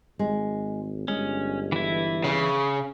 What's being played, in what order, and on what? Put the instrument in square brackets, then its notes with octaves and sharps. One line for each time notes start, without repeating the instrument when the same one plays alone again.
[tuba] G#1 [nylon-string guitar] G#3
[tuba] G1 [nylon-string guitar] G#3 [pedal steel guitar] C#4
[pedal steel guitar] E3 E4
[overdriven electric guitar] C#3